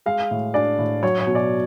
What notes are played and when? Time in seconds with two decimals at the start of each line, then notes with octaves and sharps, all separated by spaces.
0.06 G#3 F5
0.31 A2
0.54 D4 D5
0.79 A2
1.03 F#3 C#5
1.20 C#5
1.27 B2
1.35 D5